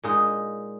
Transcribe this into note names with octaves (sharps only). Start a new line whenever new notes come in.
A#2 G#3 D#4